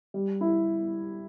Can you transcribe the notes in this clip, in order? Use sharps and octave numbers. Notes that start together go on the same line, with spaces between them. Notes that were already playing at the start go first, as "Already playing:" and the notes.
G3
E4